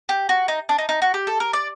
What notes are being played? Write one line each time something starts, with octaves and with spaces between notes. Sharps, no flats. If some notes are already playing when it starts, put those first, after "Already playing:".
G4
F#4
D#4
D4
D#4
D#4
F#4
G4
A4
A#4
D5